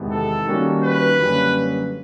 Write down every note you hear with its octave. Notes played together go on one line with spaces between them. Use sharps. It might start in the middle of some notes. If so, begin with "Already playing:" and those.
Already playing: E2 C3 D#3 G#3 B3
A4
D#3 G3 A#3 C#4 F#4
B4
F#2 D3 G3 A#3 C#4